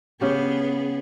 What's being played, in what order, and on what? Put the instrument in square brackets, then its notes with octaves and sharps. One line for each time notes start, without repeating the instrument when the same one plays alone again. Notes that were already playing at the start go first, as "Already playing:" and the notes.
[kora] C#3 G4 [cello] B3 G#4